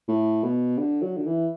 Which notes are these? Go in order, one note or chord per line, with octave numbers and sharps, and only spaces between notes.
A2
B2
D3
F#3
D3
E3